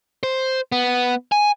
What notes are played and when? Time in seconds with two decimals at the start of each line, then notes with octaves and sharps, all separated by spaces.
0.23 C5
0.72 B3
1.32 G#5